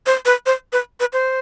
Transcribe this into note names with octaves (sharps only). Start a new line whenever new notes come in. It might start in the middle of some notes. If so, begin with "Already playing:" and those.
C5
B4
C5
B4
B4
C5